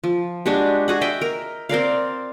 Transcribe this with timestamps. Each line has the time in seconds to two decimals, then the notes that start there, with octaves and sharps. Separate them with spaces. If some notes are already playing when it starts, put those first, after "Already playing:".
0.04 F3
0.46 G#3 D4 F#4 G4
0.88 F#4 G#4 F#5
1.01 D#5 E5 G5
1.21 A#4
1.69 C4 A#4 D5 F5